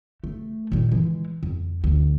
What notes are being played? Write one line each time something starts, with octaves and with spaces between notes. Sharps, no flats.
A3
A#2 D#3
E3 G#3
F2
D2